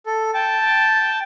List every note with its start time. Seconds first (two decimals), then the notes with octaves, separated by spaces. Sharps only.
0.06 A4
0.34 G5 A5